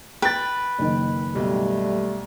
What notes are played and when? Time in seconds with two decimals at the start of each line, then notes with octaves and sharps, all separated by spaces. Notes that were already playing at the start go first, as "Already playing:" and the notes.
0.22 B4 G5 A6
0.79 F#1 D#3
1.35 B1 G3 A3